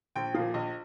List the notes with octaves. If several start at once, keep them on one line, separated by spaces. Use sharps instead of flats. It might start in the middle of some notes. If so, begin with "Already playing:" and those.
A#1 G5
A#2 F3 F5
A#1 D#5